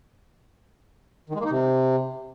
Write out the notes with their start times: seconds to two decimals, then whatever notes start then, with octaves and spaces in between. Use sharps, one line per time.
1.29 D#3
1.35 G#3
1.40 A#3
1.45 D#4
1.50 C3